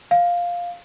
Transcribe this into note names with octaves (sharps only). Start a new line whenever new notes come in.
F5